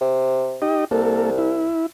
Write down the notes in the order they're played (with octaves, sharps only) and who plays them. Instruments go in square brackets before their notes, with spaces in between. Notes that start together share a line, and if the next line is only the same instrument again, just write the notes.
[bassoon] C3
[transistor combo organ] D#4 G4 D#5
[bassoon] C2 [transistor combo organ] A#3 A4
[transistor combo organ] E4